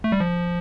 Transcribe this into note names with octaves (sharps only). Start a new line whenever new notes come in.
A3
G3
F3